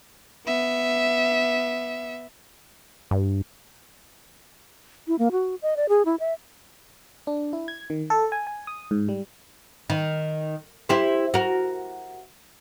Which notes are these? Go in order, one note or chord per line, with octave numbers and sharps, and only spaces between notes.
B3 E5
G2
E4
A#3
F#4
D#5
D5
G#4
E4
E5
D4
E4
G#6
D#3
A4
G#5
G#5
D#6
G#2
G3
D#3
E4 G4 C5
F#4 A#4